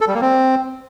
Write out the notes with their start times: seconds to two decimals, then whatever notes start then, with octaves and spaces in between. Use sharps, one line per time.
0.01 A4
0.07 G3
0.14 A#3
0.21 C4